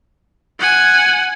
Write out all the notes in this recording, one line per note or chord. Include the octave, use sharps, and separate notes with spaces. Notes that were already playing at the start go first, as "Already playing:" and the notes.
F#5 G#5